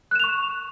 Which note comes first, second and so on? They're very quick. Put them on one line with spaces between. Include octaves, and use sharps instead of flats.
F#6 E7 F7 C#6